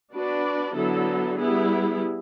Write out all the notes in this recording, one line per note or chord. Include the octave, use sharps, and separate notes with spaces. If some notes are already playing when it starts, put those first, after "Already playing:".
B3 D4 F#4 B4 D5
D3 F#3 B3 E4 A4
G3 B3 E4 G#4